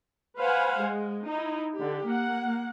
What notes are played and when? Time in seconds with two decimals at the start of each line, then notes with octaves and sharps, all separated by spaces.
0.38 B4 C5 F5 F#5 G#5
0.79 G#3
1.27 D#4 E4
1.76 D3 G4
2.07 A#3 F#5